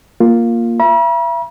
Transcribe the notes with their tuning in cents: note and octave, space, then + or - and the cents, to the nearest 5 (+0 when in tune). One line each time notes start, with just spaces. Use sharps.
A#3 +0 F4 +5
E5 +35 B5 -45